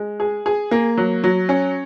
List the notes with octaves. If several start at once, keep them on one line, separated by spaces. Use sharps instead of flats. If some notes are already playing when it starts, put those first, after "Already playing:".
Already playing: G#3
G#4
G#4
A#3
F#3
F#3
C#4